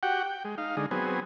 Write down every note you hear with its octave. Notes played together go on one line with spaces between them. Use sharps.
F#4 G4 F#5 G5
G5
G#3
D#4 F5
D3 G#3 D#4
F#3 B3 C4 G#4